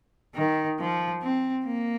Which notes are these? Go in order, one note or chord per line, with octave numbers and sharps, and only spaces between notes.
D#3
F3
C4
A#3